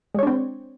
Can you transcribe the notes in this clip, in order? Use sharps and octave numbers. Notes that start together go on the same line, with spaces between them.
G#3 C4 D4 C#5